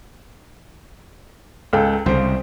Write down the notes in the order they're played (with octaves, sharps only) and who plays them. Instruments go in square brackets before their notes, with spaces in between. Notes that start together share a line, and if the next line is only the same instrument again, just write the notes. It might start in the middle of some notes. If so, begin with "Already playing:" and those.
[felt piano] C#2 A4 G5
[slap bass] C2 C#3 [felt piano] C5